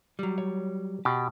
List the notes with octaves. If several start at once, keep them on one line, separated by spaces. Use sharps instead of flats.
F#3 G3
C#5
B2 G4